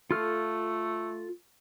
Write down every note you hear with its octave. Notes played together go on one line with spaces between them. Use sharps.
A3 F4 A4 F6